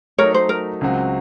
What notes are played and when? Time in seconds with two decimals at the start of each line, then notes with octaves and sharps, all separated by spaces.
0.18 F#3 A3 D#4 A#4 C#5
0.34 C5
0.49 A#4
0.81 C#2 C#3 F#3 C4 F#4